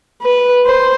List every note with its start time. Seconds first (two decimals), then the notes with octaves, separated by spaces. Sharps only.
0.22 B4
0.66 C5